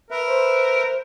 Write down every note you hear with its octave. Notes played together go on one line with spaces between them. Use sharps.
A#4 B4 E5
C5